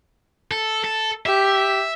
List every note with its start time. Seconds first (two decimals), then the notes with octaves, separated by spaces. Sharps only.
0.51 A4
0.84 A4
1.26 G4 E5